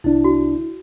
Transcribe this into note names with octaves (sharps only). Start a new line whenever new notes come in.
C2 D4 E4
F#4